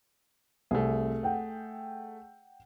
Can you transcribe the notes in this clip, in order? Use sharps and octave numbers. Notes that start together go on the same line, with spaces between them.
C2 A3 C4 G#4
F#5 G5